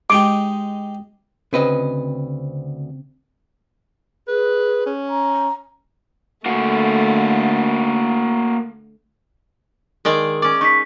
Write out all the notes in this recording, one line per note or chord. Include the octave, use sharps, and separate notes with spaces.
G#3 D#4 G4 D6
D2 C#3 C4 B4 D#5
G#4 B4
C#4
A#5
D3 A3 A#3 F#4
D#3 G#3 D5
C#4 D5 D6
D#4 C#6 B6